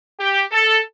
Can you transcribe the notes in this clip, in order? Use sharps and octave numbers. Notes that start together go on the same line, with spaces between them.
G4
A4